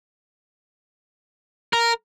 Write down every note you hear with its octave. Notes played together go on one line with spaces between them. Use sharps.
A#4